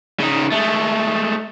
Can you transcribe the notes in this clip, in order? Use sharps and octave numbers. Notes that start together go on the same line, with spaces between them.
C#3 D#4
G#3 A3